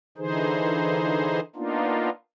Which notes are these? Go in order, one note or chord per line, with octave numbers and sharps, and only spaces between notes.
D3 E3 D#4 G#4 C5
A#3 B3 D4 D#4 F4